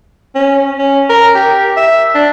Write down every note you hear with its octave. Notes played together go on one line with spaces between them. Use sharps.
C#4
C#4
A#4
G4
E5
D4